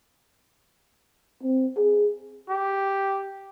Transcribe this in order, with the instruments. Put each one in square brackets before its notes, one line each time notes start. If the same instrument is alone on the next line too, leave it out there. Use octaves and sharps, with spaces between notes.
[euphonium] C4
G#4
[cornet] G4